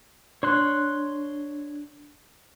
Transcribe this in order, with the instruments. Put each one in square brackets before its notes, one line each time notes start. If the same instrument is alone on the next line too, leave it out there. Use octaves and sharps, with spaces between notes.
[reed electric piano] D4 [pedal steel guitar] C#5 C6 F#6